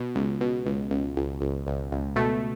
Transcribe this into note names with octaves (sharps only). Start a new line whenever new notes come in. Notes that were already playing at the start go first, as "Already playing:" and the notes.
Already playing: B2
C#2
B2
C#2
C#2
C#2
C#2
C#2
C#2
B2 A3